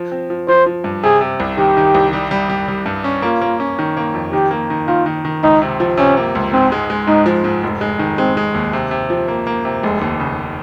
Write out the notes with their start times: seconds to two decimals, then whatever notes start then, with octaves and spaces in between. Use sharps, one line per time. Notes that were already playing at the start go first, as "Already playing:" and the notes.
Already playing: F3
0.12 C4
0.30 F3
0.48 F3 C5
0.66 F3
0.84 G2
1.03 C3 G#4
1.21 C3
1.40 C2
1.58 D#3 G4
1.77 D#3
1.95 C2
2.13 G3
2.31 G3
2.50 G3
2.68 G3
2.86 G2
3.04 C#4
3.22 A#3 F4
3.42 A#3
3.60 C#4
3.79 D#3
3.97 A#3
4.14 F2
4.32 D#3 G4
4.51 A#3
4.70 D#3
4.88 D#3 F4
5.06 D#3
5.25 D#3
5.43 C#2 D#4
5.62 C3
5.80 F3
5.97 C3 C#4
6.17 A#3
6.35 C#2
6.53 G#2 C4
6.72 G#3
6.90 G#3
7.07 G#2 D#4
7.26 F3
7.44 G#2
7.63 F1
7.81 G#3
7.99 D#3
8.18 G#3 C4
8.37 G#3
8.54 D#2
8.73 C3
8.91 C3
9.10 F3
9.28 A#3
9.47 A#3
9.65 C3
9.83 F1 G#3
10.01 D#2
10.20 C#3